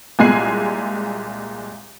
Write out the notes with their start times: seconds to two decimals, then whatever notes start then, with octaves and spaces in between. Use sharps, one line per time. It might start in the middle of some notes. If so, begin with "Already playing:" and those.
0.19 C2 A#2 G#3 G#5 F#6 C7